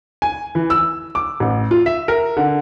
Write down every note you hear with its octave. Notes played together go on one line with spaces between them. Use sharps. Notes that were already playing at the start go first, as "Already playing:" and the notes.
G#5
E3
E6
D6
A1
F4
E5
A#4
D3